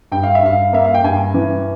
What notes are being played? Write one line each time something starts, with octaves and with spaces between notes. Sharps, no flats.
G2 G5
F5
E5
G2 F5
A#3 E5
F5
G5
G2 G#5
E3